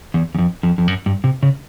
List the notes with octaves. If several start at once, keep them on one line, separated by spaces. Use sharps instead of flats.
E2
E2
F2
F2
F2
F#2
G2
C3
C#3